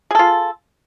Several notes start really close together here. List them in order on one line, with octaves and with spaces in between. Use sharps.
G#4 A4 F4